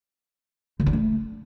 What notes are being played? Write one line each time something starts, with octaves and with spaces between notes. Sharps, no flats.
D3
D4
A3